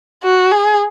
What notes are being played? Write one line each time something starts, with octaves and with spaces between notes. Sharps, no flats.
F#4
G#4